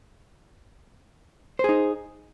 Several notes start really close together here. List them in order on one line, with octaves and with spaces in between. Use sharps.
C5 G#4 D#4